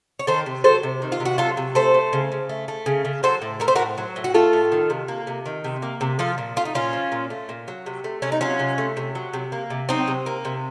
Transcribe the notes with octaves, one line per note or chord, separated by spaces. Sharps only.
C#5
D#3 A4 C5
C3
F#3 A4 C5
C3
D#3
F4
C3
F#4
F#3 F4 A4
C3
A3 A4 C5
A3
C#3
C#3
A3
A3
C#3
C#3
F#3 A4 C5
A2
A3 A#4
C5
F#4 A#4
A2
F#3
A2
F#4
A3 F4 A4
A2
D#3
C3
A#3
C3
D#3
C3
A#3
C3
F3 F4 A4
A#2
A3 F4
D#4
A#2 C#4 F4
F3
A#2
A3
A#2
F#3
C3
A3
C3 C#4
D#4
F#3 C#4 F4
C3
A3
C3
F#3
C3
A#3
C3
F#3 C4 D#4
C3
A#3
C3